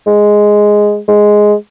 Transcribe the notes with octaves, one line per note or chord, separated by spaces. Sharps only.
G#3
G#3